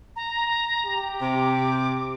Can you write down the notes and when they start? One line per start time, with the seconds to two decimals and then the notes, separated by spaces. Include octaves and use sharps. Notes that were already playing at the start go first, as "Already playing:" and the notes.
0.16 A#5
0.86 G4
1.21 C3 D6